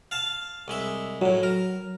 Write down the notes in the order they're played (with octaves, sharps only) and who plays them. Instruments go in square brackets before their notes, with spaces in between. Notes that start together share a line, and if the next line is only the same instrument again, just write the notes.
[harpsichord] F5 A5
C2 G#3 E5
[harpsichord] F#2 A2 [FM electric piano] F#3
[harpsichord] A#4